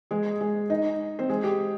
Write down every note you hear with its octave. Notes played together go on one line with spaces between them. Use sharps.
G#3 G#4
G#3 G#4
D#4 D#5
C4 C5
G#3 G#4
G4